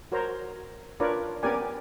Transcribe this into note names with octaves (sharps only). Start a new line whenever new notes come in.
F#4 A#4 C5 C#5 A#5
D4 F4 A#4 B4 C#5 D5
B3 C#4 G4 A#4 D5 G#5